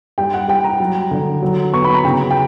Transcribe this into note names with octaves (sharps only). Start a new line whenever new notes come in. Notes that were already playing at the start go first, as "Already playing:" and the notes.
G3 G5
F#5
G3 G5
A#5
F#3
D3
F#3
B3 C#6
B5
A#5
C#3 G5
G5